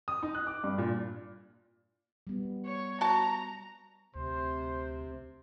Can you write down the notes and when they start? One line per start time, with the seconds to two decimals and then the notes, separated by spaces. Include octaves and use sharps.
0.08 D#6
0.23 D#4
0.35 F#6
0.47 D6
0.64 G2
0.78 A#2
2.27 G3 B3
2.66 C#5
3.01 F#4 A5 A#5
4.15 D2 C3 C5